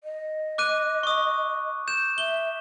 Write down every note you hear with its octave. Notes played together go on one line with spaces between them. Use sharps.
D#5
D6 F#6 D#7
C#6 D#6
G6 E7
E5 G7